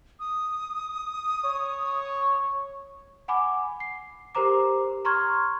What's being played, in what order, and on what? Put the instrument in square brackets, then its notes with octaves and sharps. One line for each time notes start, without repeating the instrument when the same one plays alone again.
[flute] D#6
[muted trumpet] C#5
[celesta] F#5 G#5 B5 D6
C7
G4 A#4 C5 A#5 D6
A#5 C6 C#6 F6 G#6